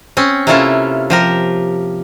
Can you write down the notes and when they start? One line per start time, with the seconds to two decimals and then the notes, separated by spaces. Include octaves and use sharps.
0.17 C4 C#4
0.47 C3 A#3 C#4 E4 F4 A4
1.10 F3 G4 A#4